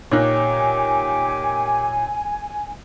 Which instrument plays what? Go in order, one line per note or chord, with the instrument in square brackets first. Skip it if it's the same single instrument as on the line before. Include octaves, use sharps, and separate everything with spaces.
[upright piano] A#2 D#4 F#6 [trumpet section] G4 D6 [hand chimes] C#5 F6 [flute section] G#5